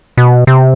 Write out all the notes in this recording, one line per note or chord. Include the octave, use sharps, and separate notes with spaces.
B2
C3